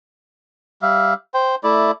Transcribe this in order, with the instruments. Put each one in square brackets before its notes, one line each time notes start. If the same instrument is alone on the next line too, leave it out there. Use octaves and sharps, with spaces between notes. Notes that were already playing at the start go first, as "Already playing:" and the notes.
[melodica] G3 E5 F5
C5 G5
A3 E4 D5